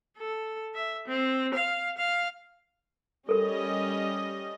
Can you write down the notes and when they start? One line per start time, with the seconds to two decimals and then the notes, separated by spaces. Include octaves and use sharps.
0.18 A4
0.75 E5
1.07 C4
1.54 F5
1.98 F5
3.29 G3 C#4 A4 A#4 D#5